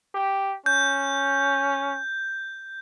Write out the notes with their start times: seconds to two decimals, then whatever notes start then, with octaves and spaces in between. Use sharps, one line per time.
0.15 G4
0.66 C#4 G6